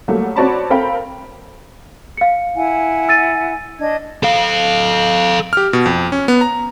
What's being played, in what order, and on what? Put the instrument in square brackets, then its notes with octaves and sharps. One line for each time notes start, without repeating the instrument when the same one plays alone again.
[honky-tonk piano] F#3 G3 A3 A#3
C4 F#4 C#5 D5 A5 B5
C4 A4 A#4 F5 G5 B5
[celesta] F5 C#7
[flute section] E4 F#5 G#5
[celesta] E6 A6 D#7
[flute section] D4 D#5 G#6
[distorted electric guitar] A4 F5
[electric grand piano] G4 F6
B2
F2
C#4
B3
A#5